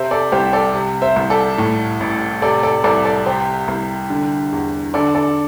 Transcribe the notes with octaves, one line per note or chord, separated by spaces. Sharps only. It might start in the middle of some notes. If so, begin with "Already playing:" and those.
Already playing: C3 C5 E5
A4 D5
C2 G4 C5
A4 D5
C3
C5 E5
C2
A4 D5
A2
A1
C3 A4 D5
A4 D5
C2 A4 D5
A4 D5
C3 G4 C5
C2
D3
E2
D3 A4 D5
A4 D5